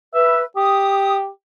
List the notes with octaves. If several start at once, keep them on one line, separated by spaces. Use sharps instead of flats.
B4 E5
G4 D#6